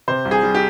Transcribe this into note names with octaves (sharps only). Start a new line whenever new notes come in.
C3 C5
C2
G#4
G3
G4